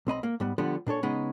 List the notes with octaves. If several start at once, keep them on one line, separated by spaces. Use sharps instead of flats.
B1 C4 D#5 B5
A#3
G#2 G3 B3
D3 F3 G3 B3
A#2 D4 A4 C#5
C#3 G#3 B3 D#4